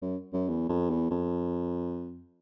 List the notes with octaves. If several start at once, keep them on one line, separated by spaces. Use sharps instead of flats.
F#2
F#2
E2
F2
E2
F2